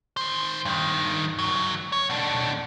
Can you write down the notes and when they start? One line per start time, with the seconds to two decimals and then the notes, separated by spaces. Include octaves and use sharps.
0.17 D#3 C5
0.65 G2 D#3
1.39 C#2 F#3
1.92 C#5
2.10 B2 D4